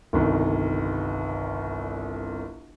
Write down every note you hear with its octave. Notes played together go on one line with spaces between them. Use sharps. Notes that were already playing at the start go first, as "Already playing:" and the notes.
G1 C2 D#3